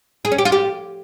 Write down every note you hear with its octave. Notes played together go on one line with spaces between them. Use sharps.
G#4
C#4
G4
F4
G4